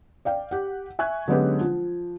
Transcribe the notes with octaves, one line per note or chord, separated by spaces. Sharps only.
D5 F5 G5
G4 F#5
E5 G#5 C#6 F#6 G#6
D3 F#3 G#3 B3 C#4 G4
F3